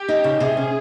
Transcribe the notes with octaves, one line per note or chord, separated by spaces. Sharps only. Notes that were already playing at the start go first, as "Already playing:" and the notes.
Already playing: G4
D#4
C#3
C3 G#4
C#4